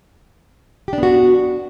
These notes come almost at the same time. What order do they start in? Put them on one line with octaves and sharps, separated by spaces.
G4 D4 B3 F#4